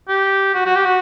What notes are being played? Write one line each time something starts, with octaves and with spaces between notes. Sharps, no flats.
G4
F#4
F#4
G4
F#4